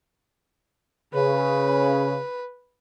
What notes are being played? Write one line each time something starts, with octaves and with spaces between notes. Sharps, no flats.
C#3 B4